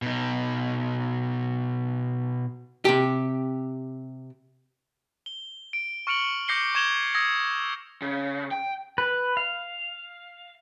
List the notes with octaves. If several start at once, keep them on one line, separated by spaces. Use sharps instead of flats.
B2 D#4
C3 G4
G7
D7
C#6 F6 C#7 D7 F7 F#7
D6 G6 A#6 C7 C#7 G7
C#6 G#6 E7 F7 G7
D#6 E6 G#6 A#6
C#3
G5
B4
F5